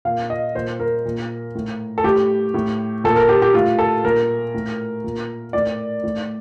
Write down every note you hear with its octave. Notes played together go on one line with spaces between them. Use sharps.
A#2 F5
D#5
A#2 C5
A#4
A#2
A2
A4
A2 G4
A2
A#2 A4
A#4
G4
G4
A2 F4
A4
A#2 A#4
A2
A#2
A2 D5
A2